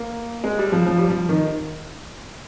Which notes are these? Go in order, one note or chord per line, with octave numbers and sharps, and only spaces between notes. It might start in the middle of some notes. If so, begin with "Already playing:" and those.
Already playing: A#3
G#3
G3
F3
F3
G3
F3
D#3